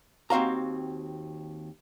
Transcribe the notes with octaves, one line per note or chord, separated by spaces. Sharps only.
D#2 C4 F#4 F5 A#5